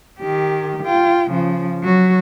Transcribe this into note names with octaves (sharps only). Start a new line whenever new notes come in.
D#3 G4
F4 G5
C#3 F3
F#3 F#4